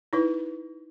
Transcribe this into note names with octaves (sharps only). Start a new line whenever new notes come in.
D#4 E4 B4